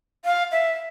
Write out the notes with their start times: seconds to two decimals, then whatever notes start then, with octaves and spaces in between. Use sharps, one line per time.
0.25 F5
0.52 E5